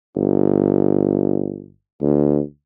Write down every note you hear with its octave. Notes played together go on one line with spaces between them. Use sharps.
G1
D2